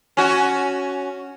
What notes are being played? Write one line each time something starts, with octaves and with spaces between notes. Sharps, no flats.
C#4 F#4